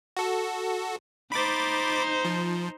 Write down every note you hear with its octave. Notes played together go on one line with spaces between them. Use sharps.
F#4 A4
D#4 C5 B5 D6 A6
F3